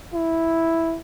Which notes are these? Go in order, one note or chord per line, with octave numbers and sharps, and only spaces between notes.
E4